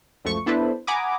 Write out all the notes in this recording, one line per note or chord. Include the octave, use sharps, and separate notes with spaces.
C#2 F#2 F3 A3 C#6
B3 D4 E4 A4 B4 C5
F#5 G#5 A#5 B5 D6 D#6